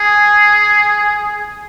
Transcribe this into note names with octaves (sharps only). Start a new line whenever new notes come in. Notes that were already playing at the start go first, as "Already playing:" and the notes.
Already playing: G#4